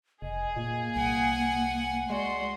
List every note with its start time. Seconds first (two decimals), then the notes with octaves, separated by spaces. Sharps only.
0.22 F1 G#4 D#5
0.56 A#2 A#3
0.96 C2 F#5 G#5
2.10 G#3 F#4 D5 C6